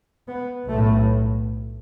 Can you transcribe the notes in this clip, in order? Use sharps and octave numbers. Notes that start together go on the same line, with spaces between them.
B3
B1 A2 A3